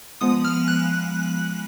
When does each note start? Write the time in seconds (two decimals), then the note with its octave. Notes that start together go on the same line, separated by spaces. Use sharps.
0.21 F3 G#3 B3 D#6
0.45 F6
0.68 F#6